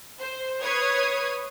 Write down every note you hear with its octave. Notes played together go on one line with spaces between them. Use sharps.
C5
B4 C#5 D#6 G#6 C7